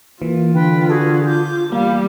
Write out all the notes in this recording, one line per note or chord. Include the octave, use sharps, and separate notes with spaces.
E3 A#3 F4
D3 B4 G5
F#4 G#4 A4
D6 G6
E2 G3 A#3 F5